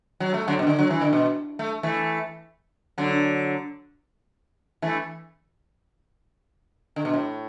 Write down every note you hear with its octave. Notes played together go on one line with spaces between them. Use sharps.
F#3
A3
D3 F#3
B2
D3
F#3
E3
D3
B2
A3
E3 A3
D3 F#3
E3 A3
D3
B2
A2